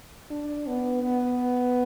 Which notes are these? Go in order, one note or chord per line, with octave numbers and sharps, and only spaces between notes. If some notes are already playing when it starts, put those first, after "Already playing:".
D4
B3
B3